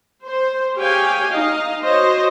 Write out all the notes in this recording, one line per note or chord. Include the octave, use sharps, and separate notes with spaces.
C5
G4 G#4 C#5 F5 G5 G#5
D#4 D#5 F5
F#4 C5 C#5 D#5